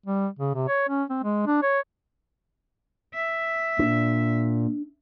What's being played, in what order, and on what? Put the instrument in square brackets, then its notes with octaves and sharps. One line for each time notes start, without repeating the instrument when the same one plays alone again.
[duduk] G3
C#3
C3
C#5
C#4
C4
G#3
D4
C#5
[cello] E5
[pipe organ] A#2 [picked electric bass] D4